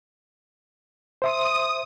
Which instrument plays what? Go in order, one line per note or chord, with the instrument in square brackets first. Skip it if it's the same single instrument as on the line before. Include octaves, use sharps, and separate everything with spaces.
[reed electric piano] C5 E5 C6 [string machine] D#6